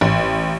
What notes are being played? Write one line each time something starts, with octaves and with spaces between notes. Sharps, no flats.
A1